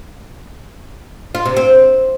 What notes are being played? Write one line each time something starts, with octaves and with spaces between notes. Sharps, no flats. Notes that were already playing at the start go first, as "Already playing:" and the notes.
F4
C3
C4